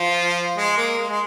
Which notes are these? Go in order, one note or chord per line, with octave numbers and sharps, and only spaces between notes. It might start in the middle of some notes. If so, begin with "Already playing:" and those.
Already playing: F3 F4
G#3
A#3
G#3
G#3